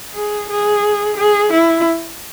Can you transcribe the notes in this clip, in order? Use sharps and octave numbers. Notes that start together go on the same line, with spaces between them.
G#4
G#4
G#4
E4